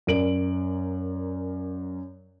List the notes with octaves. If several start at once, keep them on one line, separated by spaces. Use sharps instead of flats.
F#2 A#4 D5 D7 F#7